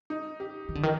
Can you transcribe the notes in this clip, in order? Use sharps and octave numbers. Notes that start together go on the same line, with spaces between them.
D#4
G4
D#3
D3
D#3